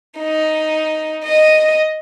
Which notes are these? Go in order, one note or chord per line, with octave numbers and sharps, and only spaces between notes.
D#4
D#5